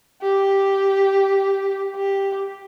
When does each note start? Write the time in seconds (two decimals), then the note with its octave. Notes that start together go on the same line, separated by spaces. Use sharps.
0.22 G4
1.95 G4